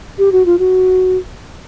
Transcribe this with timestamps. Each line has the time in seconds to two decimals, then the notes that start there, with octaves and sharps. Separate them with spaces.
0.18 G4
0.32 F#4
0.46 F4
0.59 F#4